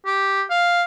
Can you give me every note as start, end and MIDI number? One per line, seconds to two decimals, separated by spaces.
0.06 0.42 67
0.50 0.83 77